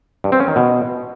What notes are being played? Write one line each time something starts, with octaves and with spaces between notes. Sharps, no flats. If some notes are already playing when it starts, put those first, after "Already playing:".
G2
C4
C#4
D#3
B2